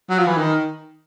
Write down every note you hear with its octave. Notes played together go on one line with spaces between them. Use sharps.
F#3
F3
E3
D#3